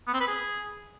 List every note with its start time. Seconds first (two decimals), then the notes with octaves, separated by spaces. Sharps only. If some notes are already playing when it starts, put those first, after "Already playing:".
0.07 B3
0.14 C4
0.21 B4
0.27 G#4